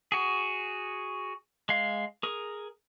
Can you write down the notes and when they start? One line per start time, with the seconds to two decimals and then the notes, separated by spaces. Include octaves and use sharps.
0.12 F#4 G#4
1.69 G#3 F5
2.23 G#4 A#4